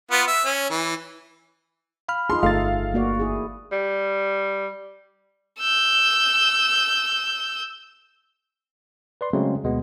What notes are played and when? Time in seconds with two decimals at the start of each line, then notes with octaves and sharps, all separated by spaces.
0.11 B3 F4
0.27 E5
0.45 C#4
0.70 E3
2.08 F5 B5 F6
2.30 D#4 F4 G#4 C6
2.43 G1 A3 A4 F5 A6
2.94 A#3 F#4 D5
3.20 E4 G#4
3.72 G3
5.60 E6 G6
9.21 B4 D5 C6
9.33 C#3 F#3 G#3 A3 C4
9.64 D2 B2 G#3 B3